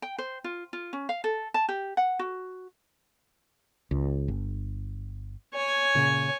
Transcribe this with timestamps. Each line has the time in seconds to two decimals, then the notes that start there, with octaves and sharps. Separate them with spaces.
0.02 G5
0.18 C5
0.44 F4
0.73 F4
0.93 C#4
1.09 F5
1.24 A4
1.54 A5
1.69 G4
1.97 F#5
2.19 F#4
3.91 C#2
4.28 G1
5.54 C#5 G#5
5.95 A#2 C#3